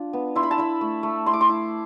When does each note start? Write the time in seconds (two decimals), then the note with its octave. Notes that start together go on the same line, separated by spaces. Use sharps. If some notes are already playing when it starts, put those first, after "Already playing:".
Already playing: D4 F4
0.13 B3
0.36 E4 C6
0.43 B5
0.51 A5
0.58 E4 B5
0.81 A3
1.03 A3
1.26 E4 C6
1.33 D6
1.41 C6
1.49 E4